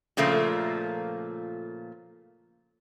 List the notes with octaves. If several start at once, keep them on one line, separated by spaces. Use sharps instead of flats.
A#2 C#3 F3 A3 A#3